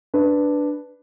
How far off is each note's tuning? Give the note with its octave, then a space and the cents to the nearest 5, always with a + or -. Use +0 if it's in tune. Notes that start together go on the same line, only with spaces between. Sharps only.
D4 +0 B4 +0